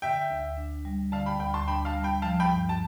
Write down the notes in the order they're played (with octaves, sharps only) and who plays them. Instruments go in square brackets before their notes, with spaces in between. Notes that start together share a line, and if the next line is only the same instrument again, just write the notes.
[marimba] D3 [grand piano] E5 G5
[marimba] D2
D4
G3
[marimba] D3 [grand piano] F5 A5
[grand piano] G5 B5
[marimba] D2 [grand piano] G5 B5
[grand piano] A5 C6
[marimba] D4 [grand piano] G5 B5
[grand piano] F5 A5
[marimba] G3
[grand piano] G5 B5
[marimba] F3 [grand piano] F5 A5
[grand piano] G5 B5
[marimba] G2
[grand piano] A5